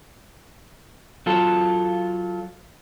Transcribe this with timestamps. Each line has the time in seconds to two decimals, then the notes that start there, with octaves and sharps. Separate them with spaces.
1.26 F#3 F4 A4